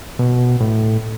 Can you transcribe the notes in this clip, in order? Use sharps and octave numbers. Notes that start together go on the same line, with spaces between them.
B2
A2